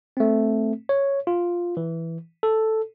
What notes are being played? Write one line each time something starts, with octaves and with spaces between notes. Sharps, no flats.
A3 C4
C#5
F4
E3
A4